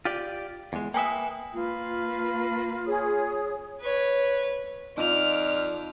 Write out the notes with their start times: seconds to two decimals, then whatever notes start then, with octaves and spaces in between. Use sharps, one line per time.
0.05 F4 G4 D5
0.73 E2 G#3
0.94 A#3 B4 E5 G5 G#5 D#6
1.54 A#3 F4 B4
2.86 G#4 C#5 D#6
3.81 B4 C#5
4.97 F2 D#4 F4 D5 D6 F6